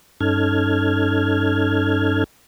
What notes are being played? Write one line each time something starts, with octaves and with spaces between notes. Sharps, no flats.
G2 C#4 D#4 A4 F6 G#6